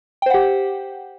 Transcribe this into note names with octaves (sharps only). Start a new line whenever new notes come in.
G4 C5 F#5 G5